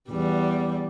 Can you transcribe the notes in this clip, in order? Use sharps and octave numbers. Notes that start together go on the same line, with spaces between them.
E2 G3